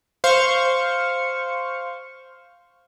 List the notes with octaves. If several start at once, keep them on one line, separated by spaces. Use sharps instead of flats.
C5 F5 C#6